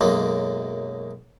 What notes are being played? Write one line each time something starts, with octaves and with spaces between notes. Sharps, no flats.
B1 F#2 G#3 A#3